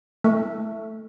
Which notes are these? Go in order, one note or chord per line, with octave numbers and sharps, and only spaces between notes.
A3